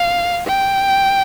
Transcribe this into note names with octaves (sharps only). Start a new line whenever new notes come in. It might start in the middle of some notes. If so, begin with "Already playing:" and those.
Already playing: F5
G5